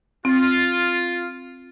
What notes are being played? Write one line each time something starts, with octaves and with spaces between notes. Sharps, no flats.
C4 F4